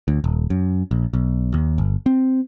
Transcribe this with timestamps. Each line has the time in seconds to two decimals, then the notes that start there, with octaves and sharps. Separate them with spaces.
0.08 D2
0.24 D#1
0.50 F#2
0.91 A#1
1.13 B1
1.54 D#2
1.78 G1
2.06 C4